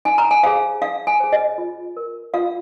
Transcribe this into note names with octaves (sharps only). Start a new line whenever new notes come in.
D#4 G#5
A#5
G#5
G#4 C5 F5
D#4 F5
G#5
G#4 C5
D#5
F4
A#4
F4 F5